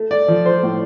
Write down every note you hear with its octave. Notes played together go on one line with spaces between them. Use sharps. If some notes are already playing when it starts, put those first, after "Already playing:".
Already playing: A3
D5
F3
C5
A2